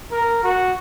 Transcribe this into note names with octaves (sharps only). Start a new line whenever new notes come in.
A#4
F#4